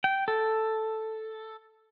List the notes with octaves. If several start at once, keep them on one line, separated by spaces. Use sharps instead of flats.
G5
A4